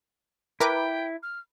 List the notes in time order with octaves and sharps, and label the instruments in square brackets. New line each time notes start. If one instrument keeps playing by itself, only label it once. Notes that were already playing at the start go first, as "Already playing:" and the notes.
[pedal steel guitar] E4 [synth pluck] A#4 B4 D6 [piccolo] G5
[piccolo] F6